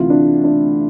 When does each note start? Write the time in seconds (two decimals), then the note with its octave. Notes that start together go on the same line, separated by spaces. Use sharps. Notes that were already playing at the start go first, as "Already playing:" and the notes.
Already playing: D2 C3 E3 E4 F4
0.10 D4
0.44 D4